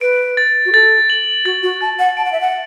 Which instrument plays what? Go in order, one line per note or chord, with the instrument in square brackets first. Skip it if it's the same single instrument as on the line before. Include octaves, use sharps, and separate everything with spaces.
[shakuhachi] B4 [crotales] D7
[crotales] A6
[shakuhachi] F#4
[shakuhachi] A4 [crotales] A6
[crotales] F#7
[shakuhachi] F#4 [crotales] A6
[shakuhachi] F#4
[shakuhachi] A5 [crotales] A6
[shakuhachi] F#5
[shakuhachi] A5 [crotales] D7
[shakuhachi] F#5
E5
F#5